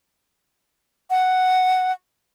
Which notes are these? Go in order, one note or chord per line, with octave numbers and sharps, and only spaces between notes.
F#5